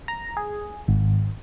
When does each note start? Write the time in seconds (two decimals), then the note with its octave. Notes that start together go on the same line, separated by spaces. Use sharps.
0.08 A#5
0.37 G#4
0.88 G#1